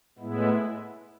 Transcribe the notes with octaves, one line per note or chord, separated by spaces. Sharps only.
A2 G#3 B3 E4